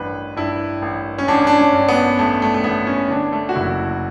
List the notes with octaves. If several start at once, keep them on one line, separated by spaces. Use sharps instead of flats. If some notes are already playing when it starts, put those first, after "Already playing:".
Already playing: A1 G2 B4
G2 E4
A1
C#4
A1 D4
D4
C#4
G2
B3
A1 A3
A3
A3
A1 B3
C#4
D3 D4
A3
F#4
F#1 E4